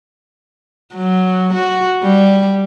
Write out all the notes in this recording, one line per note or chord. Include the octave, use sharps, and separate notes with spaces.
F#3
F#4
G3